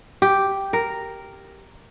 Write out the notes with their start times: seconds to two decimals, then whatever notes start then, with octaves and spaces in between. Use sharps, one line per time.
0.22 G4
0.73 A#4